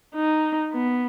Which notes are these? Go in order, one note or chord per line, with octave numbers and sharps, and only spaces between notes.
D#4
B3